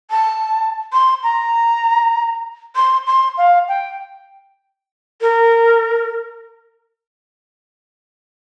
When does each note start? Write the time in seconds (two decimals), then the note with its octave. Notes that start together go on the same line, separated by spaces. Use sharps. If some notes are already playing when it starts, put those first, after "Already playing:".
0.11 A5
0.93 C6
1.23 A#5
2.76 C6
3.07 C6
3.37 F5
3.68 G5
5.21 A#4